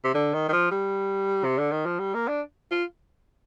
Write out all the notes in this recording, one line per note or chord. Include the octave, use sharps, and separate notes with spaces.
C3
D3
D#3
D#3
F3
G3
C3
D3
D#3
F3
G3
A#3
D4
F4